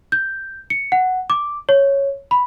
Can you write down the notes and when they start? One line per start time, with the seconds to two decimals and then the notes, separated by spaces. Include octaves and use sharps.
0.12 G6
0.70 C#7
0.92 F#5
1.30 D6
1.69 C#5
2.31 B5